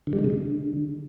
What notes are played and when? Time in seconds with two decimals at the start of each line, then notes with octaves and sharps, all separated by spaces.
0.07 D3
0.13 G3
0.19 G#3
0.24 C3
0.30 D3